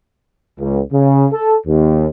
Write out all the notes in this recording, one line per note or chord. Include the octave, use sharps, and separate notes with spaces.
C#2
C#3
A4
D#2